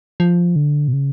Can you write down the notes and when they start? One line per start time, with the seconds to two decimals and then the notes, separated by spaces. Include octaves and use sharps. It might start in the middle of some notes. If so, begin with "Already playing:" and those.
0.20 F3
0.56 D3
0.88 B2
0.93 C#3